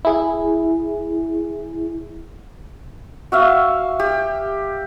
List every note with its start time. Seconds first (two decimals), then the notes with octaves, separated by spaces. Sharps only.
0.05 E4 G#4
3.32 F#4 E5 F5
3.99 G4